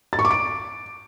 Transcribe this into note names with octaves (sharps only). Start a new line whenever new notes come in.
A6
C#6
D6
D7